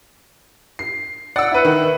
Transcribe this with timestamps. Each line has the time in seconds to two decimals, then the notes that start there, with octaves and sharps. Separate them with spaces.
0.79 C7
1.36 D5 F#5 E6
1.52 E4 B4
1.65 D#3